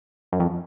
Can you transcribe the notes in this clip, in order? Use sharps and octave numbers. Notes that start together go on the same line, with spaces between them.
F#2
F2